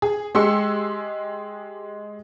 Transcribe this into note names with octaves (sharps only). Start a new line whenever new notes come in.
G#4
G#3 G4 G#4 C6 E6 C#7